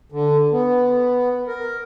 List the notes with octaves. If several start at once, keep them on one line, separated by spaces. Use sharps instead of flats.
D3
B3
A#4